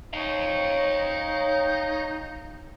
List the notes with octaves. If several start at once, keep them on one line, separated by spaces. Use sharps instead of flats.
D#4 C#5 F5 G5